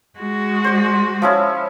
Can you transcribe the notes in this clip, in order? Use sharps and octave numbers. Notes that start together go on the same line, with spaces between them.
G#3 F#4
C5 D5
F3 C#4 E4